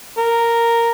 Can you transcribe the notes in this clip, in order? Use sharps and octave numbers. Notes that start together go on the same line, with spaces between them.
A#4